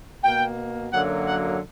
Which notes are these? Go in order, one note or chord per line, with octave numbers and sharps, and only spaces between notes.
B2 A#3 G5
F#2 D3 F#3 A#3 F#5
F#5